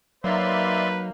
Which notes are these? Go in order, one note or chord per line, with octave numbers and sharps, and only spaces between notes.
F#3 A#3 D#4 B4 D5 E5 C6